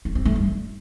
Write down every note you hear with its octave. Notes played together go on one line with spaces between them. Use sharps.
C4
C4
A3
G3
F4